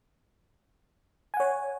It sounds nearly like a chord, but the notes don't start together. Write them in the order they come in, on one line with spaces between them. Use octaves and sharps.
G#5 F#5 C#5